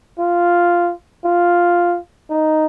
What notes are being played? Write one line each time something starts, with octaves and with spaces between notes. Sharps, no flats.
F4
F4
D#4